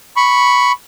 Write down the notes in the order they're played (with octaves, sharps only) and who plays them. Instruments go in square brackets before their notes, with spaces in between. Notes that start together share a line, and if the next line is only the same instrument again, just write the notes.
[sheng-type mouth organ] B5 C#6